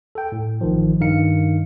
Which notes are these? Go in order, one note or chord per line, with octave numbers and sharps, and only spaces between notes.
A4 G5
A2
A1 D#3 F3
G2 D#3 D#4 F5 C#7